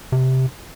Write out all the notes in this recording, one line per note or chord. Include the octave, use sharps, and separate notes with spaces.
C3